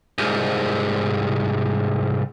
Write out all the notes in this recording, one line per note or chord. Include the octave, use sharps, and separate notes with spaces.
C2 G#2